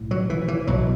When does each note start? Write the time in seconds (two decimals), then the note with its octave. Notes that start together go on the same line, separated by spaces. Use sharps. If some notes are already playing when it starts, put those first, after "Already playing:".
Already playing: B1 A2
0.11 F#3
0.30 E3
0.48 E3
0.67 B1 B2 F#3